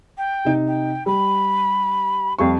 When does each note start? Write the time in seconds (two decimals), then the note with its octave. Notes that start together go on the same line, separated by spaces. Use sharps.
0.17 G5
0.45 C3 D#4
0.67 G5
1.06 G3 B5
2.39 F2 G3 F5 C#6